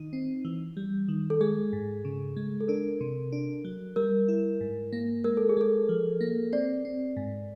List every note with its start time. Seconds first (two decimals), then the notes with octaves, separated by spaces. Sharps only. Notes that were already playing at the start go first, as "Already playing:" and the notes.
Already playing: D#3 D#4
0.13 C4
0.45 E3
0.77 G3
1.08 D#3
1.30 A4
1.41 G#3 G#4
1.73 G#2
2.05 C#3
2.37 G#3
2.61 A4
2.68 D4 A#4
3.01 C3
3.32 D4
3.65 F#3
3.96 G3 A#4
4.28 E4
4.61 G#2
4.93 A#3
5.24 G#3 A#4
5.37 A4
5.49 G#4
5.57 G#3 A4
5.89 F3
6.21 A#3
6.52 C4 D5
6.85 C4
7.17 G#2